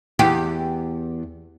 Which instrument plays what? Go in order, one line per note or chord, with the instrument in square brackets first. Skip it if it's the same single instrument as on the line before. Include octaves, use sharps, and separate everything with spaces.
[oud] E2 G4